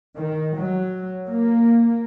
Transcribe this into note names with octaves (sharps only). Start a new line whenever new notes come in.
D#3
F#3
A#3